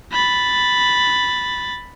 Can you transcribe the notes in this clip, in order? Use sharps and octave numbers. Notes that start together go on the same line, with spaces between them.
B5 A6